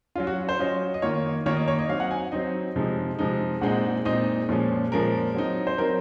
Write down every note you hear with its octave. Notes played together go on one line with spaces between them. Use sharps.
F#3 C#4 F4
F#4
C5
F#3 C#4 F4 D#5
D#5
D#3 A#3 F4 C#5
D#3 A#3 F4 C#5
D#5
C#5
D#5
F#3 C4 D#4 F5
F#5
G#5
F#3 C4 D#4 D#5
C3 F3 G#3 D#4
C3 F3 G#3 D#4
A#2 G#3 C4 D#4 F#5
A#2 G#3 C4 D#4 D#5
A#2 F3 G#3 C#4
A#2 F3 G#3 C#4 A#4
F#3 C4 D#4
C5
F#3 C4 D#4 A#4